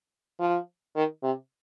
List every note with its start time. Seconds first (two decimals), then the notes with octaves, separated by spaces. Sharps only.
0.40 F3
0.96 D#3
1.23 C3